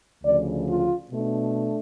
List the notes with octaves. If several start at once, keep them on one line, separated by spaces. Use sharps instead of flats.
D2 C#3 F3 D5
F4
B2 A3 D4